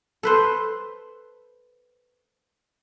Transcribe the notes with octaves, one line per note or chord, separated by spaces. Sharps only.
A4 B4 C5